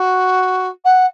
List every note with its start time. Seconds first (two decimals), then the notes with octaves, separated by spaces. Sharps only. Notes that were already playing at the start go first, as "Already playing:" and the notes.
Already playing: F#4
0.84 F#5